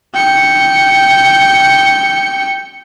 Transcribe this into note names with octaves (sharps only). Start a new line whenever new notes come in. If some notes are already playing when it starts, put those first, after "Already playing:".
G5 C#7